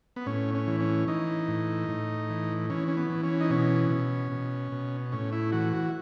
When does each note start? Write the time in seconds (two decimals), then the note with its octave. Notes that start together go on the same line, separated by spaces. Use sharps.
0.16 B3
0.26 A2 C#4
0.54 C#4
0.67 E3
0.80 C#4
1.08 E3 D#4
1.48 A2
1.88 A2
2.29 E3
2.70 E3 C#4
2.88 C#4
2.97 B3
3.10 E3
3.24 C#4
3.41 D#4
3.50 B2 C#4
3.90 B2
4.32 B2
4.72 B2
5.12 A2 C#4
5.32 E4
5.52 E3 F#4
5.73 F#4